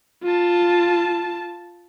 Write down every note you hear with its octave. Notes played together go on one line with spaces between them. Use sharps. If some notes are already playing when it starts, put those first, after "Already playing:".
F4 A5